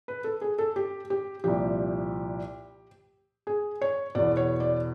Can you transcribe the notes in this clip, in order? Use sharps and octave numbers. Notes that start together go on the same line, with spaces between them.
B4
A4
G#4
A4
G4
G4
C2 A#2 F3 G4
G#4
C#5
E2 B2 D5
C#5
D5